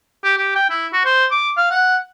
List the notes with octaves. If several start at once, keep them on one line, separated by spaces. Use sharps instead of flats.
G4
G4
G5
E4
F#4
C5
D6
F5
F#5